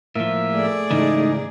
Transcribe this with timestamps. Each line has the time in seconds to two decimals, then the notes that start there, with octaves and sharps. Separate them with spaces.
0.16 A2 F3 A#3 E5
0.52 A3 G#4 D5
0.91 G#2 C#3 E3 D#4